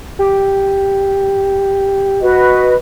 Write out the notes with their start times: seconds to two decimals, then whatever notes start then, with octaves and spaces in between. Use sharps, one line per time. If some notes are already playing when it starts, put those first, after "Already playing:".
0.19 G4
2.21 F#4 B4 D#5